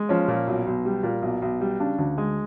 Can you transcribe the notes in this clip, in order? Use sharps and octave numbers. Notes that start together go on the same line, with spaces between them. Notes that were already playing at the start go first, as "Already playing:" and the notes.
Already playing: G#3
F3 C#4
A#2
B1
B1
G3
A#2
B1
B1
G3
C#3 D4
D2
G#3